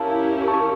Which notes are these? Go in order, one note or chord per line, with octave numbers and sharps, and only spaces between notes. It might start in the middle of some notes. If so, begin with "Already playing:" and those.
Already playing: C#4 E4 G4 A#4 F5 A5
A5 C#6